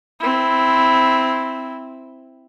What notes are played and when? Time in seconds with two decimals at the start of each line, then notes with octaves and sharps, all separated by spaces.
0.20 C4 E4